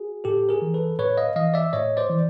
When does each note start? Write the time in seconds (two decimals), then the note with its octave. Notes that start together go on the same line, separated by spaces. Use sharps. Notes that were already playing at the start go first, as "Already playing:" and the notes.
Already playing: F#4 G#4
0.24 A2 G4 A4
0.49 G#4 A#4
0.62 E3
0.74 A4 B4
0.98 A2 B4 C#5
1.18 D#5 F5
1.36 E3 D#5 F5
1.54 D5 E5
1.73 A2 C#5 D#5
1.97 C5 D5
2.10 E3